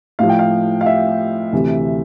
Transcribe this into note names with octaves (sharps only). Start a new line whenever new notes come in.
A2 F3 F5
G5
F5
F5
E5
D2 C3 E3